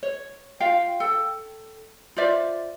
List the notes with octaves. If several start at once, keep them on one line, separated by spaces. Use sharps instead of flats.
C#5
F4 F5 G5
A4 G5
F4 C5 D5 E5